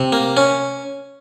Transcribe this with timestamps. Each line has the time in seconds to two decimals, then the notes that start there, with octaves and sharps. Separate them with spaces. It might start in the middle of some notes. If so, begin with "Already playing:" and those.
Already playing: C3
0.12 A#3
0.37 C#4